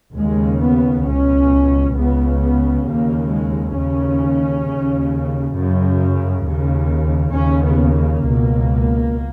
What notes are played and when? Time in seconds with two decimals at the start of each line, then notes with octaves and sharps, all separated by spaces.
0.16 D#2 C#3 G#3
0.61 B3
1.05 C#2 B2 C#4
1.96 C#2 C#3 B3
2.40 B3
2.85 D#2 C#3 A#3
3.30 G#3
3.75 D#2 C#3 C#4
4.65 D#2 C#3
5.54 F#2 C#3
6.44 D#2 C#3
7.34 D#2 C#3 C#4
7.64 B3
7.94 A#3
8.24 C#2 B2